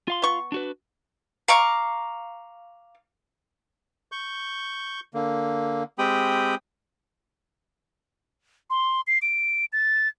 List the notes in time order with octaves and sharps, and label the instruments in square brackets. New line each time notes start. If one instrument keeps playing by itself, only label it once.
[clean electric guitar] F4 F5 C6
[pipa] B3 C#6
[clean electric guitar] D4 F#4 B4
[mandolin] F5 A#5 C#6 D6
[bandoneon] C#6 G6
D3 A#3
G#3 C4 G4 G5 B5 D#6
[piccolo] C6
C7
D7
A6